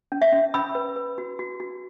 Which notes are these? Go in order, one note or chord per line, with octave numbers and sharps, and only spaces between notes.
C#4
E5
C#4
C#4 B5 E6
B4
B4
F#4
F#4
F#4